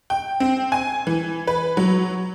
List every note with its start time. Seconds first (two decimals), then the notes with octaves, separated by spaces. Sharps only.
0.10 G5
0.40 C4
0.72 G#5
1.07 E3
1.47 B4
1.77 F#3